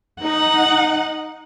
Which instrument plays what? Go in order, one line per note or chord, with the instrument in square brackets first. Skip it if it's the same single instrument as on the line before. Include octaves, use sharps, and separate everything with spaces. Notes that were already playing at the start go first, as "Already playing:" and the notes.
[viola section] D#4 [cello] F#5